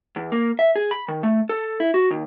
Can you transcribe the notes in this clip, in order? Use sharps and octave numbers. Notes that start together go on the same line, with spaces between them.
E2
A#3
E5
G#4
B5
D#3
A3
A4
E4
F#4
D#2